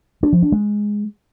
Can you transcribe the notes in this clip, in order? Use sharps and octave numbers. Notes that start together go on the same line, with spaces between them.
D4
F3
D4
G#3